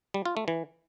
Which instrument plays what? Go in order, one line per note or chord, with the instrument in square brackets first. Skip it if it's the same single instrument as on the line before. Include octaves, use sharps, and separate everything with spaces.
[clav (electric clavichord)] G3
F4
A3
E3